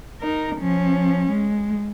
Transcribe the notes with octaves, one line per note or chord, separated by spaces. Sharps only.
D#4 A#4
F3 C#4
G#3